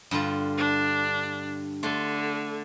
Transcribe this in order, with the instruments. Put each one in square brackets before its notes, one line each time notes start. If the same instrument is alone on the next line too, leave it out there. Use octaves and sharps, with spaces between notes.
[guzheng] G2 D3 F4
[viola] D4
[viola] D3 [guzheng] A3 C6